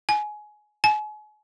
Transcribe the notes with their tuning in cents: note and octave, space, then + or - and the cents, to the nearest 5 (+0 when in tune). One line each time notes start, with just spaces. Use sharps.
G#5 +20
G#5 +40